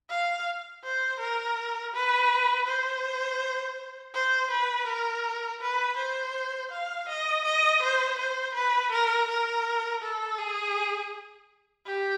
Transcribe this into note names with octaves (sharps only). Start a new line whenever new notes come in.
F5
C5
A#4
B4
C5
C5
B4
A#4
B4
C5
F5
D#5
D#5
C5
C5
B4
A#4
A#4
A4
G#4
G4